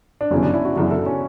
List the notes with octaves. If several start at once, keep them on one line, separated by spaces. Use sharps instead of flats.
D4
G1 F#2 C#3 E3 C#4
D4
E4
F#4
G1 F#2 C#3 E3 F#4
A4
C#4